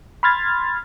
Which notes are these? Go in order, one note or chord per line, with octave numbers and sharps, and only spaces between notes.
B5 C6 F6 G#6 A6